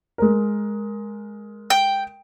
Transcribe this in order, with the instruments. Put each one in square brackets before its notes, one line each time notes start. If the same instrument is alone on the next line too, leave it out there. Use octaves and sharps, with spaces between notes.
[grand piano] G#3 A#4
[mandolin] G5